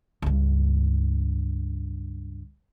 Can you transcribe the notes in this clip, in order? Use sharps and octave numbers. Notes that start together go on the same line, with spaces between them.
C#2 G2